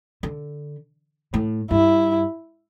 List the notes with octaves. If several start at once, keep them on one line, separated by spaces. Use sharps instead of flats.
D3
A2
G2 E4